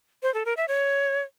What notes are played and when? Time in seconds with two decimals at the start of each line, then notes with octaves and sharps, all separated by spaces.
0.23 C5
0.34 A4
0.46 A#4
0.57 E5
0.68 C#5